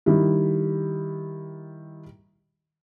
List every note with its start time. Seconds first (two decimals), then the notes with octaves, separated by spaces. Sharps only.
0.06 D#3 G3 E4